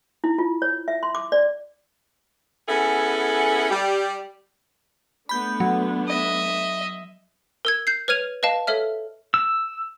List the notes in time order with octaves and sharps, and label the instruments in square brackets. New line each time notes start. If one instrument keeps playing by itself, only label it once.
[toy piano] E4
F4
C#5
E5
C6
D6
D5
[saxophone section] B3 C#4 E4 G#4 A4 F#5
G3 G4
[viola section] A3 B3 D4 [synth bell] B5 G6
[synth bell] F#3
[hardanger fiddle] D#5 E5
[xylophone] A#4 E6 G#6
G6 C7
B4 C#5 F6 G#6 D#7 F7
B4 D#5 F5 A5
A4 C#5 E5 F6
[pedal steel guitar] E6